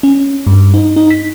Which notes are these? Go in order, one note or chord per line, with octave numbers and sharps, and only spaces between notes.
C#4
G2
D#4
D#4
B6